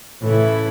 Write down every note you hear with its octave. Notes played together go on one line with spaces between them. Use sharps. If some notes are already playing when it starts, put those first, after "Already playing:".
A2 C#3 E3 A3 E4